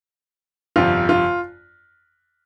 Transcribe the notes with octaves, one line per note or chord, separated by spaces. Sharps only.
G1 F2 C3 F4
F4